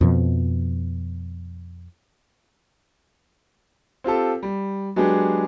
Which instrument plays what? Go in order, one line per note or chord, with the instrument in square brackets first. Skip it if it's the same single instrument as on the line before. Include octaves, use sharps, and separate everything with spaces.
[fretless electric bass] F2 B2 F3
[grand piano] C4 F4 G4 A4
G3
F#3 G#3 B3 D4 G4 G#4